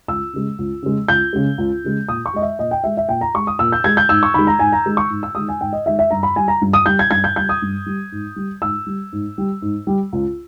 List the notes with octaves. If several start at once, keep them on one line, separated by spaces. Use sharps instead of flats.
C#2 E6
C#3 G#3
C#2
C#3 G#3
C#2 G6
C#3 G#3
C#2
C#3 G#3
A#2 D#6
C#6
G#3 D#5
E5
A#2 D#5
G5
G#3 E5
E5
A#2 G5
A#5
G#3 C#6
D#6
A#2 E6
G6
G#3 G#6
G6
G#2 E6
C#6
D#3 G#3 B5
A#5
G#2 G#5
A#5
D#3 G#3
C#6
G#2
E6
D#3 G#3 D#6
G#5
G#2 G5
D#5
D#3 G#3 E5
E5
G2 A#5
B5
G3 G#5
A#5
G2
D#6
G3 G6
G#6
G2 G#6
G6
G3 G6
D#6
G2
G3
G#2
G3
G#2 E6
G3
G#2
G3
G#2
G3
C#2